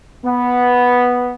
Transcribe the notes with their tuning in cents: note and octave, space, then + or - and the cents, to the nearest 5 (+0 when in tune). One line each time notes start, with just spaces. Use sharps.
B3 -5